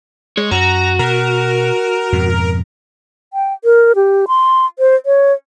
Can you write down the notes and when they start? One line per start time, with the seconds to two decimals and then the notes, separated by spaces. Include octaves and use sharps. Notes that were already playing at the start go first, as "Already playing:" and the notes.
0.37 G#3 C#5
0.51 F#2 F#4 A#5
0.99 B2 A#4
2.12 F2 G#2 B2
3.33 G5
3.64 A#4
3.95 G4
4.28 C6
4.79 C5
5.06 C#5